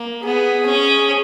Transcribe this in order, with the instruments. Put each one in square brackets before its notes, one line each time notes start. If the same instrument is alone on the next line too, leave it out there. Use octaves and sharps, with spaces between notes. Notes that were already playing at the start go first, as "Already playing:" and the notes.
Already playing: [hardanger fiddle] A#3
[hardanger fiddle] B3 [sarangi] G#4
[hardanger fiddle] C#4